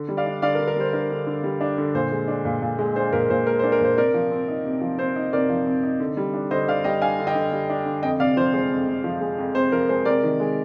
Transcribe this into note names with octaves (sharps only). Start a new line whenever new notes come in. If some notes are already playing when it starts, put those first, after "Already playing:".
Already playing: D3
G3
D5 F5
D4
D3 D5 F5
A#4
D3
A#4
G3 C5
D4 A#4
D3
D3
G3
D4
D3
A#2 C5
G#3
D4
A#2
A#2
G#3
D4 C5
A#2 A#4
A#2 C5
G#3 A#4
C5
D4
A#4
A#2 C5
C3 A#4 D5
F3
C4
D#4
C3
F3
C4 C5
D#4
C3 A#4 D5
F3
C4
D#4
D3
G3
D4
D3 C5 D#5
D3 D5 F5
G3 D#5 G5
D4 F5 G#5
D3
D#5 G5
D3
G3
D4
D3
F2 D#5 G5
C3 D5 F5
F3 C5
G#3 C5
F2
C3
F3
G#3
F2
C3 C5
F3 A#4
G#3 C5
C3 A#4 D5
D#3
G#3